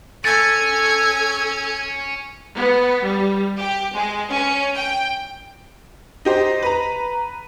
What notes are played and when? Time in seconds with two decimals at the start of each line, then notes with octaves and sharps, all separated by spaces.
0.25 C#4 A4 G#5 G#6 A6
2.56 B3
3.04 G3
3.61 G4
3.96 G#3
4.32 C#4
4.79 G5
6.25 D#4 G4 C5
6.62 B4 A#5